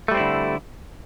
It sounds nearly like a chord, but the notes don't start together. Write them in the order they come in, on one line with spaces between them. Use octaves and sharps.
A3 G3 C4 E4 D3